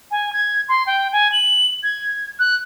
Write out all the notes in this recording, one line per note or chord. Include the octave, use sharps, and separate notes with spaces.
G#5
G#6
C6
G5
G#5
F#7
G#6
F#6